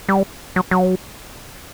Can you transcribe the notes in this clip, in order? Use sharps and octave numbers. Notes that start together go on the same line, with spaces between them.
G3
F#3
F#3